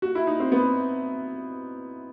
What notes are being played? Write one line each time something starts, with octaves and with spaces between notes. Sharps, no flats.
F#4
E4
D#4
C4
B3